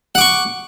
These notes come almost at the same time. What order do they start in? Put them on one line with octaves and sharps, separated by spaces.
F#5 D6 C#6